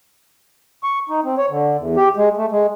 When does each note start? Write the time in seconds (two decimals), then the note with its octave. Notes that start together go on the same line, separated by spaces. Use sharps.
0.83 C#6
1.09 D#4
1.24 C4
1.38 C#5
1.50 D3
1.78 E2
1.97 G4
2.17 G#3
2.37 A3
2.52 G#3